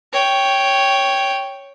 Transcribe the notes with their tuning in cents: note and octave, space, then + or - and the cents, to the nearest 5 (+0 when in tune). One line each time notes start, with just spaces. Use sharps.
C#5 +0 G5 +0